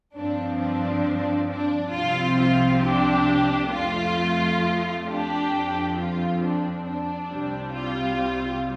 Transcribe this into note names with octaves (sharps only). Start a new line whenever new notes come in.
G2 F3 C4 D4
D4
D4
C2 C3 F3 C4 F4
F4
D4 G4
F2 F3 A3 F4
D4 G4
F2 F3 C4
F4
D4
D4
C2 C3 G3 C4
F4